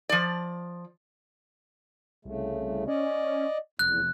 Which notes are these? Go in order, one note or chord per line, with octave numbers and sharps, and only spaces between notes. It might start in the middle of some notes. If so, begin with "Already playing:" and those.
F3 D5
C2 C#3 A3
C#4 D5 D#5
F1 E2 F#6